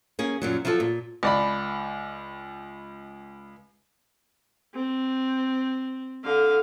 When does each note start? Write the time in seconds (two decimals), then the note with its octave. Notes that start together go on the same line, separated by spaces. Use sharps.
0.19 A#3 C#4 G#4
0.42 F#2 A#2 F#3
0.65 F3 F#3 E4 F4 A4
0.80 A#2
1.23 C#2 D5 B5
4.74 C4
6.24 D3 F5